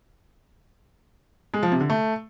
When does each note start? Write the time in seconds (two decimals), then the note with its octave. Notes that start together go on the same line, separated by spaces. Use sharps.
1.54 G#3
1.63 F3
1.72 C3
1.81 D3
1.90 A3